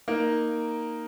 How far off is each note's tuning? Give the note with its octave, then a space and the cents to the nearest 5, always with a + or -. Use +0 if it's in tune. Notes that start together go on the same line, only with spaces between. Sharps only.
A#3 +0 D#4 +0 A#4 +0